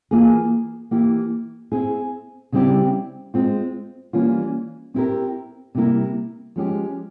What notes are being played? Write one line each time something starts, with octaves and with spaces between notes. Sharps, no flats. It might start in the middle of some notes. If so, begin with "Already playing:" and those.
E3 A#3 F4 G#4
E3 A#3 E4 G4
C4 E4 G#4
C#3 G3 C4 E4 G4
G#3 C4 F4
E3 G3 A#3 C#4 F4
C4 E4 G4 A#4
C3 G3 A#3 E4 A#4
F3 G#3 C#4 G4